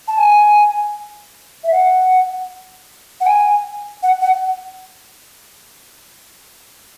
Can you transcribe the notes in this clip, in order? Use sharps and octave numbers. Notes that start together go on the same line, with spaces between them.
A5
G#5
E5
F#5
F#5
G#5
F#5
F#5